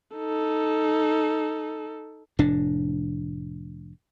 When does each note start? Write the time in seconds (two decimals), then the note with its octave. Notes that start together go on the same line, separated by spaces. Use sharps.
0.16 D#4 A4
2.39 F1 A2 D4